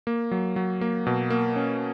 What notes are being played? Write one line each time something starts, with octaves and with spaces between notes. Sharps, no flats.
A#3
F#3
F#3
A#3
B2
A#3
C#4